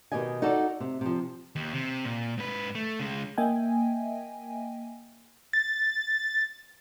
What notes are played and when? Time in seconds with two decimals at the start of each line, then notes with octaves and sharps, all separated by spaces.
0.12 B2 D#3 G4 D#5 G#5
0.42 D#4 F#4 A4 D5
0.80 C3
1.01 C3 F3
1.56 D#2
1.74 C3
2.04 A#2
2.38 G#2 B4
2.75 A3
2.99 C#3 G#3
3.38 A#3 D#5 E5 G5 G#5
5.53 A6